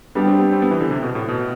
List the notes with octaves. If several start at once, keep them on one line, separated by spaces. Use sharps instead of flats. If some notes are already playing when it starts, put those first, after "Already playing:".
G3 B3 D4 G4
C4
B3
C4
B3
E3
D3
C3
B2
A2
B2